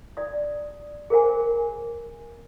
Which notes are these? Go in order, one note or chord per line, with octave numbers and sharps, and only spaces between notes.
D5 D#6
G#4 A#4 C5 F#5 G#5